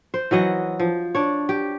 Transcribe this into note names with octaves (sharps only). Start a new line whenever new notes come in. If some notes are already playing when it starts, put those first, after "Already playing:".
C5
E3 F#3 D#5 F#5
F3
D4 C#5
G4